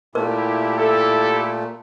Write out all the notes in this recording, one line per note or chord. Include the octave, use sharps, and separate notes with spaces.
A#2 A3 E4 G4 A#4
A4